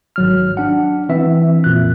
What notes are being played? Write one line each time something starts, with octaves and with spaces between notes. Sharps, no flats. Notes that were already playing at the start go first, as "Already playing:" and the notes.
G#1 F#3 F6
D4 F#5
E3 C4 E5
F2 A#2 F#6